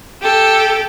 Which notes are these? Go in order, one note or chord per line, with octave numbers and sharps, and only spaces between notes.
G4 A4